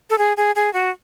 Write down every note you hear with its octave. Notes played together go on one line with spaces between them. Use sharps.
A4
G#4
G#4
G#4
F#4